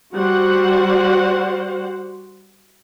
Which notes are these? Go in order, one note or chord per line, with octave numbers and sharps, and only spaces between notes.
G3 F#4 C5 F#5